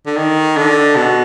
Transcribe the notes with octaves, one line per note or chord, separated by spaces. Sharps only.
D3
D#3
D3
B2